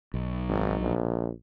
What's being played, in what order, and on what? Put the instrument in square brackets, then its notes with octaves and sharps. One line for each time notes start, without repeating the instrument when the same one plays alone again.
[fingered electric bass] B1
[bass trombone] G#1
A#1